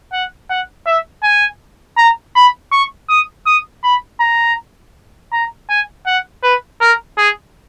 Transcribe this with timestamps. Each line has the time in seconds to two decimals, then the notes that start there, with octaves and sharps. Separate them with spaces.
0.13 F#5
0.50 F#5
0.87 E5
1.24 G#5
1.98 A#5
2.36 B5
2.72 C#6
3.10 D#6
3.47 D#6
3.84 B5
4.21 A#5
5.33 A#5
5.70 G#5
6.07 F#5
6.43 B4
6.81 A#4
7.18 G#4